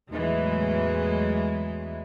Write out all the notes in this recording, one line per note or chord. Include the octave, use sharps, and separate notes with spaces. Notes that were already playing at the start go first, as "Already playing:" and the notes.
E2 A2 E3 F#3 G#3